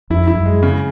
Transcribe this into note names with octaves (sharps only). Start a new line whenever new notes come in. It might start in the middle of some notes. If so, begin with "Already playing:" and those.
F2 E4
E4
F#2
G#3
C#3